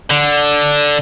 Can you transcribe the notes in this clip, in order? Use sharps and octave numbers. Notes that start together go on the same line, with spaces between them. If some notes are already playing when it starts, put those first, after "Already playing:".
D3